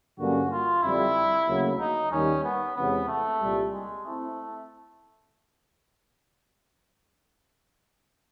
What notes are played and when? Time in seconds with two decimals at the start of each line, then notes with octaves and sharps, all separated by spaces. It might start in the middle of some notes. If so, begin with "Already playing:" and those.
0.19 G2 D3 F#3 A#3 C#4 F#4
0.51 F4
0.83 F2 D3 G3 E4
1.48 D2 C#3 F#3 A#3
1.79 D#4
2.11 D#2 D#3 G3 A#3 C#4 D#4
2.44 B3
2.76 E2 C3 E3 G#3 B3 C#4
3.08 A3
3.41 C2 A#2 G3
3.73 G#3
4.05 A3 C4 E4